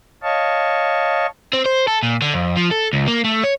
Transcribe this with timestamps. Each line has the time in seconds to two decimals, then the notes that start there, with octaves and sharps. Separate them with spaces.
0.23 C#5 D#5 F5 A5 C#6
1.53 C4
1.66 C5
1.88 A4
2.03 A#2
2.22 D3
2.34 F2
2.57 F3
2.71 A4
2.93 C#2
3.08 A#3
3.24 A3
3.44 C#5